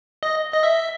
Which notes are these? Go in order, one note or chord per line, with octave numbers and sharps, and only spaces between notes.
D#5
D#5
E5